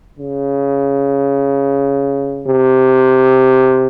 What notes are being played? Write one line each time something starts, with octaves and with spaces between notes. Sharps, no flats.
C#3
C3